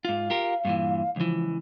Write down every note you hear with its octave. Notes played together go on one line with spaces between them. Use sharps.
G#2 F4 F5
F4 G4 A#4
G2 A#2 E3
C#2 E3 F3